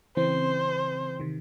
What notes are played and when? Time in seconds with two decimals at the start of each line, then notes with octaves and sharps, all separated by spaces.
0.17 C#3 E3 C4 C5
1.20 C3 D#3